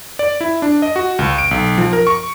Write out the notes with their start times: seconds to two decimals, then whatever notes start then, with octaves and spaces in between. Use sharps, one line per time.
0.19 D5
0.41 E4
0.62 D4
0.82 D#5
0.96 F#4
1.19 C#2
1.38 D7
1.51 B1
1.78 F3
1.93 A#4
2.07 C#6